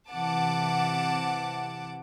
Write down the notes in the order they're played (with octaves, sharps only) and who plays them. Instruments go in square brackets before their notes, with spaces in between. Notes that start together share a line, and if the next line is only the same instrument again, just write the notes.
[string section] C3 E3 F#5 A5 D6